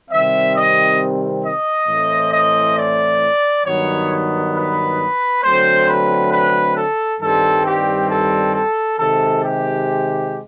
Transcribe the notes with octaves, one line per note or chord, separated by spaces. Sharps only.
C3 D#3 G3 C4 E5
D#5
D#5
A2 E3 A3 C4
D#5
D5
G2 D#3 F#3 B3 C#5
B4
D3 F#3 A3 C4 C5
B4
B4
A4
G2 D#3 G3 C4 A4
G4
A4
A4
C3 D#3 G#3 A4
G4